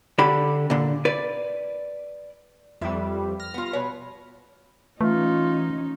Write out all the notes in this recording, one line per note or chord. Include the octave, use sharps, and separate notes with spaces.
D3 D4 G4 B5
A#2 D3
B4 D5
F2 G3 B4 E5
F6 A#6
B3 F4
B2 B4 C#5
E3 A3 C#4 D#4 F4